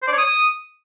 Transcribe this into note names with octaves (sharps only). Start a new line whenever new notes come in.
C5
D5
C#5
D#6